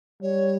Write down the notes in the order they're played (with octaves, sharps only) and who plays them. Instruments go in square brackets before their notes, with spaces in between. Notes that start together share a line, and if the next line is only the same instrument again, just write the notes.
[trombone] G3 [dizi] C#5